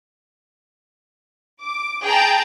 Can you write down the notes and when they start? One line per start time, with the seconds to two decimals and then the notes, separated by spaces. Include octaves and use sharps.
1.60 D6
2.03 G#4 G5 A5 A#5